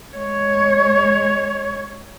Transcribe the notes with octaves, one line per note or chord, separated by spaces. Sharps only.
G#3 C#5